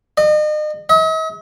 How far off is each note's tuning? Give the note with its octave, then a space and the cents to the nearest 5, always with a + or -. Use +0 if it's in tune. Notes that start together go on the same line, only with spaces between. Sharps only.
D#5 -40
D#5 +45